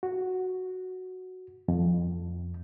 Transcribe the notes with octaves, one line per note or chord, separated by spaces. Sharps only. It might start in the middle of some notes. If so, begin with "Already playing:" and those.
F#4
F2